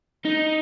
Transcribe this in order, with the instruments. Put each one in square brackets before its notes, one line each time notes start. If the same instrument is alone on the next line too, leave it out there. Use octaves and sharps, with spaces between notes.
[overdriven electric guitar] D#4